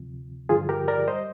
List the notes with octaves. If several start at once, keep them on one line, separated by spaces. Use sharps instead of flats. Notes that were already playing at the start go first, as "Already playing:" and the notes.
Already playing: D2 C3 F3
G2 D3 F3 F4 G#4
G4 A#4
A#4 D5
G3 C5 D#5